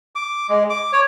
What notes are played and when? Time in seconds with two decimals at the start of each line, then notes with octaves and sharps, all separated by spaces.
0.15 D6
0.49 G#3
0.70 D6
0.93 C#5